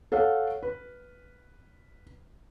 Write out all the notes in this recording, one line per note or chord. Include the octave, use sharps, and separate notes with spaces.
A4 C#5 F5 F#5
B4